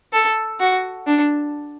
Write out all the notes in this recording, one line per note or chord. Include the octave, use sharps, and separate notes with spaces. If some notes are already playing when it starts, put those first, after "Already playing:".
A4
F#4
D4